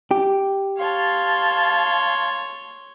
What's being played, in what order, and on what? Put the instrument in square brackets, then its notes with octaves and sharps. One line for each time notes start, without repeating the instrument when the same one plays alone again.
[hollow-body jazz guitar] G4
[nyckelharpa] C#5 C6 [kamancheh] F5 A5